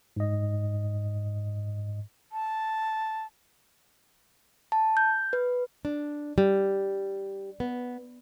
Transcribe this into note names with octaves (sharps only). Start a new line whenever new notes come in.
G#2 D#5
A5
A5
G6
B4
D4
G3
B3